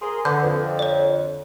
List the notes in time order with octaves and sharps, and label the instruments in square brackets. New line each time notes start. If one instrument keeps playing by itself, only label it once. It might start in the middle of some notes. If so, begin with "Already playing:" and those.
[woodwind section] G#4 A#4 C6
[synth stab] D3 [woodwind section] B3 [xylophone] G6
[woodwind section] F2
[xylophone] C#5 D5